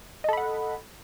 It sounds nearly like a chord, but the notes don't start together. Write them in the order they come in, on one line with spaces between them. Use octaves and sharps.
D#5 A4 B5 F#5